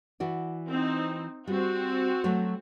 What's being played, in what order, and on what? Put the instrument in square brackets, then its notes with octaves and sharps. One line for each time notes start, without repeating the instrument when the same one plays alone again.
[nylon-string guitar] E3 F#4 D5
[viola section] C4 D#4
[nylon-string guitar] G3 [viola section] C4 F#4
[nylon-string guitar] F#3 A3 C#5